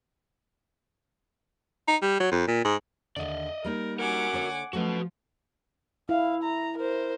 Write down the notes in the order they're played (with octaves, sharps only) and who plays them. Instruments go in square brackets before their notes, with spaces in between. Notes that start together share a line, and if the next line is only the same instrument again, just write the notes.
[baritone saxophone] D#4
G3
F#3
F2
A#2
G#2
[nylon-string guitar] D#2 G#2 D3 [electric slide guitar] D5 D#5
[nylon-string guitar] G3 A#3 D#4 [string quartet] A#4
[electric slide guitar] F#4 A#4 [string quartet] F#5 G#5 D6
[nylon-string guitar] D3 A4 C#5
[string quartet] F3 [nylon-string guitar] F#3 A3 C#4 [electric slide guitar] F#4 B4
[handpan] E4 [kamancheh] F5
[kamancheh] A#5
A#4 C5